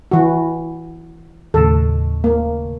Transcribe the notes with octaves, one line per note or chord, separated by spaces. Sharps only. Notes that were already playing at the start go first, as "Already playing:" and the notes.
E3 F#4
D#2 A2 C#3 A4
A#3